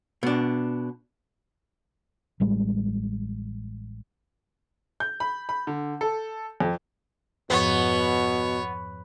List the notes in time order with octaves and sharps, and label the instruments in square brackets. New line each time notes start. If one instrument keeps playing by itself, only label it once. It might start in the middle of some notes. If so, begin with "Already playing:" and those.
[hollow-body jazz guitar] B2 D4
[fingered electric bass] A1 A2 G3 G#3
[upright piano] G6
B5
B5
D3
A4
F2
[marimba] F2 G#2 F3 [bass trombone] B2 [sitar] B3 [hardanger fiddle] C#5